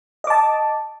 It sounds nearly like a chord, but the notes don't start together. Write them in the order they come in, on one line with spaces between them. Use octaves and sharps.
D#5 D6 A5